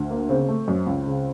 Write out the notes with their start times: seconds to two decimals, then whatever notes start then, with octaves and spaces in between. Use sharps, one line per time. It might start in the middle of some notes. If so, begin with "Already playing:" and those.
Already playing: D2
0.10 A#3
0.29 C#3 C4
0.49 A3
0.68 F#2
0.86 C#2
1.06 C#3